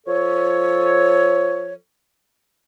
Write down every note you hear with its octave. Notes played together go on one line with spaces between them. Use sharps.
F3 A4 C#5